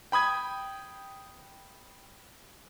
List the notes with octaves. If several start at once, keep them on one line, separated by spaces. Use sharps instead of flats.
G5 B5 D#6 G#6